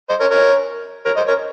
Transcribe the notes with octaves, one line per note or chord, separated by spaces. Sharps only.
C5 D#5
A#4 C#5
A#4 C#5
A#4 C#5
C5 D#5
A#4 C#5